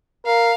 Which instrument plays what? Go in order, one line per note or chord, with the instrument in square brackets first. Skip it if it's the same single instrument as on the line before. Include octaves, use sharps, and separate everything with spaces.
[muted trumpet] A#4 [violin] F5